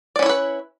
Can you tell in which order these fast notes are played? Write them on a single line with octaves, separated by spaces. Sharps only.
D5 C#4 E4 C#5 B4